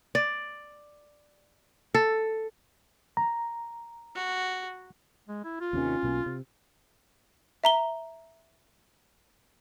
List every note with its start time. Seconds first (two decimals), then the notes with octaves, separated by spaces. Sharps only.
0.15 D5
1.95 A4
3.17 A#5
4.15 F#4
5.28 G#3
5.44 E4
5.61 F4
5.73 D#2 C3 D#3 C#4
6.03 B1 B2 A#3
6.26 C3
7.64 E5 A#5 G7